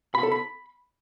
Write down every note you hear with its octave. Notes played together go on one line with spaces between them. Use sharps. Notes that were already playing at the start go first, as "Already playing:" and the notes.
B5
A4
B5